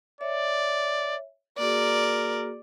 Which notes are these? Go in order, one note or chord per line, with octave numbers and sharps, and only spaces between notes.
C#5 D5 E5
A#3 F#4 G#4 A#4 D5